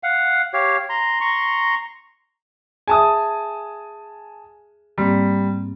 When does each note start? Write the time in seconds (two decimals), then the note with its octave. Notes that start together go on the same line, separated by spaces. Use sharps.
0.03 F5 F#5
0.53 G4 C#5 F5
0.89 A#5 C6
1.21 A#5 C6 C#6
2.88 G#4 E5 G#5 A5 D#6
4.98 G#2 G3 A#3 C4